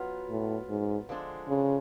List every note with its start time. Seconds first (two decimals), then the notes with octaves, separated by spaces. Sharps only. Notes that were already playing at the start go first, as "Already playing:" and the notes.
Already playing: F#3 B3 F4
0.29 A2
0.70 G#2
1.09 D3 F3 G#3 D4
1.49 C#3